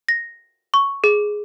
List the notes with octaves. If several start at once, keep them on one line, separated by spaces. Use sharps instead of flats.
A#6
C#6
G#4